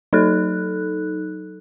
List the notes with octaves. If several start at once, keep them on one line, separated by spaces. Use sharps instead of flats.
F#3 D#4 A4 F#6